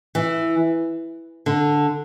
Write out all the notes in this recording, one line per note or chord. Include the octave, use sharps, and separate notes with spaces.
E3
D3